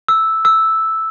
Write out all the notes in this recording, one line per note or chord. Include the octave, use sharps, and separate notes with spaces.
E6
E6